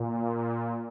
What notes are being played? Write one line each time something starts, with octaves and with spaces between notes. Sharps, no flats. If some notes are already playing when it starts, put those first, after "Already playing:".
Already playing: A#2